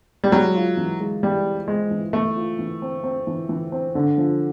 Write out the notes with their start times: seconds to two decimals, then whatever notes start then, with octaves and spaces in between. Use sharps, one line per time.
0.24 G3
0.32 F#3 G#3
0.55 F4
0.77 E3
1.00 G#3
1.23 E3 G3
1.45 C4
1.68 G#3 C4
1.91 E3
2.13 E3 A3
2.36 F4
2.59 E3
2.82 C4
3.04 C4
3.27 E3
3.49 E3
3.72 C4
3.95 D3
4.17 F3